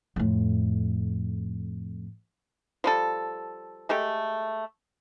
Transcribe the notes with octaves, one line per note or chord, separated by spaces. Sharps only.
F2 A2
F3 G3 A4
G#3 A3 G4 A4